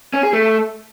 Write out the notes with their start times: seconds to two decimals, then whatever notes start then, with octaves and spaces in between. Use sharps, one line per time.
0.14 C#4
0.23 G#4
0.33 A3